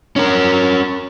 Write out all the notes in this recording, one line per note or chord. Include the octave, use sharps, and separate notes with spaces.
C#4 A#4